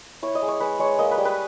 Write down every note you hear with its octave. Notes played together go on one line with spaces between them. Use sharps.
E4 C#5
D#5
G#3
C#5
G#3 B4
G#3 C#5
A#3 D#5
B4
G3
B4